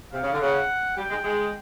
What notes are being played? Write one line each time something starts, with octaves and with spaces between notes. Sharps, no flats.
C3 F5
C#3
D3
C#3 F#5
G3 G5
G#3
G#3